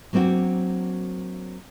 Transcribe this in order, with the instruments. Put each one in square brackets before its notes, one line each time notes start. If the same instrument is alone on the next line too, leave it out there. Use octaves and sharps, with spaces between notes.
[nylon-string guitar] F#3 A#3 C4 D4 F#4